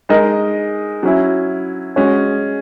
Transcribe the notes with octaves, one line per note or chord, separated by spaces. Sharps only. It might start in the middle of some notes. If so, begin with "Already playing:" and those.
G#3 D#4 A#4 D#5
F#3 C#4 E4
G#3 C#4 F#4 C#5